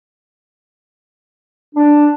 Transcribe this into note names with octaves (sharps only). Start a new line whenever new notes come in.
D4